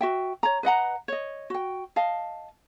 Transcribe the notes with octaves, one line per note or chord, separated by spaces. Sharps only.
F#4 E5 G5
C#5 A#5
B4 D#5 F#5 A#5
C#5 D#5
F#4 G5
D#5 F5 A5